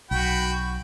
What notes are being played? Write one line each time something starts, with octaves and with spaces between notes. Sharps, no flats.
B1 F#4 G5 B5